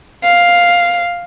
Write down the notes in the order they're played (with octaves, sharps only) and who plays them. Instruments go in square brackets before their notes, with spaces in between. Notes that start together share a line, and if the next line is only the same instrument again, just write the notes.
[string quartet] F5